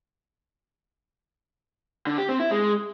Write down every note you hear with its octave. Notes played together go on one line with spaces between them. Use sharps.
D3
G4
C4
E4
G#3